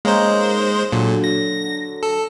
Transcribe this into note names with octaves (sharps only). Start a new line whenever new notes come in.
G#3 A#3 C#4 D#4 C5
A#2 D3 F#3
A#6
A4